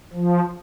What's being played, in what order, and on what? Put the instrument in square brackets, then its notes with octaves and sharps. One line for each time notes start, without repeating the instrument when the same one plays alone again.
[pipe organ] F3